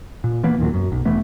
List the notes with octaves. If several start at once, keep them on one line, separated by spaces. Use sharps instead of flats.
A#2
E3 A#3 B3
D#2 A#2 F#3
F#2
B1
E1 E3 A3 B3